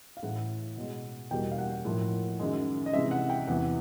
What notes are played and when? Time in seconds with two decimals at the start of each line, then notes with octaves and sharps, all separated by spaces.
0.17 F5
0.23 A2 E3 A3 F#5
0.77 B2 G#3
1.31 E2 B2 G3 A#3 G5
1.51 F5
1.58 F#5
1.85 A2 F3 A#3
2.39 F#2 D#3 G#3
2.86 D#5
2.93 C3 E3 G#3 E5
3.11 F#5
3.30 G5
3.47 E2 C3 E3 F#5